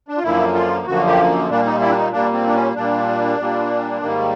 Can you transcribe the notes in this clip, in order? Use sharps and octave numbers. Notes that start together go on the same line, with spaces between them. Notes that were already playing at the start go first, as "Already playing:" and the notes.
D4
F4
F#2 D3 F3 A#3 E4
F4
F#2 D3 F3 A#3 F#4
G4
A#2 G3 A#3 D4
D#4
E4
D4
D#4
A#2 G3 A#3 D4
C4
D4
C#4
A#2 G3 A#3 D4
A#2 G3 A#3
G#2 D#3 G3 A#3